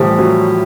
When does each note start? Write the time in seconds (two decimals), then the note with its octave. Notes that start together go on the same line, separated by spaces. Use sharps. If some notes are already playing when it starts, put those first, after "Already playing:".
Already playing: A2 E3 F3 G3
0.19 F#3